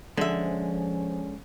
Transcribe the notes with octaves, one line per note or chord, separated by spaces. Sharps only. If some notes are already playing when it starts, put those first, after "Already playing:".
D3 F3 G#3 C#4 E5